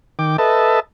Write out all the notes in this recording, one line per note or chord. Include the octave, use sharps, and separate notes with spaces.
D#3 G5 D6
A4 B4 D#5 E5 A5